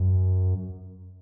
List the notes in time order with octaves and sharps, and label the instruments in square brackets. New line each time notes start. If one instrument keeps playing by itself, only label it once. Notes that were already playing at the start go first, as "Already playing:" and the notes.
Already playing: [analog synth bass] F#2